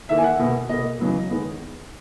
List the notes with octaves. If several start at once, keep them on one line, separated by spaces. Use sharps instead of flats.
E2 D#3 A#3 E5
G#5
F#5
B2 A#3
B2 A#3 D#5
E2 C#3 F#3 B3
D#3 G#3 B3